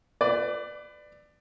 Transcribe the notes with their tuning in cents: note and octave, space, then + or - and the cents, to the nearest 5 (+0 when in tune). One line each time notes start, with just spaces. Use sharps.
B4 +30 D5 +15